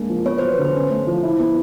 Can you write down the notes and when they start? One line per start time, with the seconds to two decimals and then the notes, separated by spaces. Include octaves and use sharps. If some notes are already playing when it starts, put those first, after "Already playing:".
Already playing: G#3 A#3 D4
0.09 F3
0.25 B3 C#5
0.38 F#3 C5
0.52 B4
0.58 D3
0.65 C5
0.75 C#4
0.90 A3
1.07 F3
1.23 E4
1.39 B3